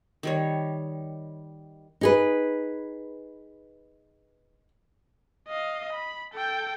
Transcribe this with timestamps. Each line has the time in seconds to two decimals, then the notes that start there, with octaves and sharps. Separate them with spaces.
0.23 D#3 G3 C#5
2.01 D#4 G#4 B4
5.48 D#5 F5
5.93 B5
6.34 A4 G5